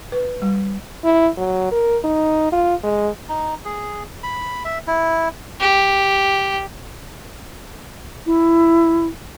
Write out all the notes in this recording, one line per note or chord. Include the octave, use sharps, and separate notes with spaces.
B4
G3
E4
F#3
A#4
D#4
F4
G#3
D#4
G#4
B5
E5
E4
G4
E4